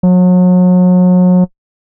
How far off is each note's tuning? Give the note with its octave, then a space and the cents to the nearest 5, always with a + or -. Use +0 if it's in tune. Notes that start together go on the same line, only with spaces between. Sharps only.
F#3 -35